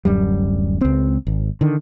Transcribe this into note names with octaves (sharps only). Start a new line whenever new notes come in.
D1 F#2 G3
C#2 C4
G#1
D3 D#3